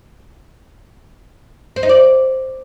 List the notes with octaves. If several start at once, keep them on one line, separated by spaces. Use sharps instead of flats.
C5
D#4
D5